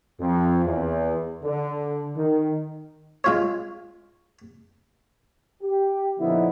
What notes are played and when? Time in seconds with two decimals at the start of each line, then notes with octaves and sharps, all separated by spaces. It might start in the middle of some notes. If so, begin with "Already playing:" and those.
0.20 F2
0.65 E2
1.43 D3
2.17 D#3
3.24 G#3 F4 C#5
5.62 G4
6.20 A#2 D3 F3 B3 D#4 E4